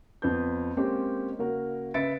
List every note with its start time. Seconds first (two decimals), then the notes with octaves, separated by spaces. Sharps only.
0.22 F2 B3 B4 G6
0.77 G#3 A#3 C4 C#4 G4
1.39 C#3 A#3 C#4 F#4 A#4
1.94 C#3 B4 E5 A6 C#7 D7